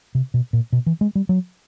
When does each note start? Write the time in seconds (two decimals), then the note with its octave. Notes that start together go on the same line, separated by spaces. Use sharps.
0.15 C3
0.34 B2
0.53 A#2
0.73 B2
0.86 E3
1.01 G#3
1.15 G3
1.29 F#3